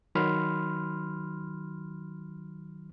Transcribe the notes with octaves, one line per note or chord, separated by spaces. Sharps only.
D#3 F#3 B5 C6 F6